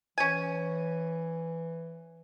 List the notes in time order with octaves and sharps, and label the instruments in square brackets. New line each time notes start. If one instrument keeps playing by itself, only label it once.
[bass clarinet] E3 [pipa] C#4 G#5